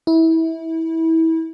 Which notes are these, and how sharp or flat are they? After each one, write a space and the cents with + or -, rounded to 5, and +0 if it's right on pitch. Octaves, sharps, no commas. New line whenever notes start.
E4 -25